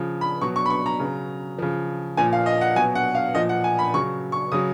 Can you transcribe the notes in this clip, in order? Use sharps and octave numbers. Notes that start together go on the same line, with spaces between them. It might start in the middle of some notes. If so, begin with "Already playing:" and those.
Already playing: C#3 F3
B5
B2 F#3 C#6
C#6
B5
C#6
A#5
C#3 F#3
C#3 F3
A#2 F3 G#5
F5
D#5
F#5
B2 F#3 G#5
F#5
F5
A#2 F3 D#5
F#5
G#5
B5
C#3 F#3 C#6
C#6
C#3 F#3 D#6